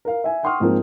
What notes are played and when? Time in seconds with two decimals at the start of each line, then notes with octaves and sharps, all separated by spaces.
0.05 A#4 F5
0.24 E5 G#5
0.43 F#5 G5 C6 C#6 D#6 F6
0.60 G#2 F3 A#3 C4